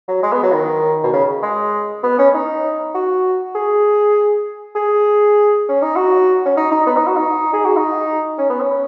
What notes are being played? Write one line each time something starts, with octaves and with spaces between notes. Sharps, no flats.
F#3
G#3
B3
F#3
D#3
B2
C#3
G#3
B3
C#4
D#4
F#4
G#4
G#4
C#4
D#4
F#4
C#4
D#4
D#4
B3
D#4
F#4
D#4
G#4
F#4
D#4
C#4
B3
C#4